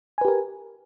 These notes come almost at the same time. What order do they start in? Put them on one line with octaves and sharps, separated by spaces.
G#5 B4 G4 A#4